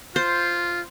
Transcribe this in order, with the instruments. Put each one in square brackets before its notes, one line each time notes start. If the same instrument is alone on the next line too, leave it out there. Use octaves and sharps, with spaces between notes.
[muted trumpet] F4 [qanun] C5